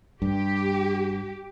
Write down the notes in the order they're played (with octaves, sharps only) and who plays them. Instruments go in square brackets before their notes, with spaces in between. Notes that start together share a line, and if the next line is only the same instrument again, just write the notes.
[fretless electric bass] G2 [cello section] G4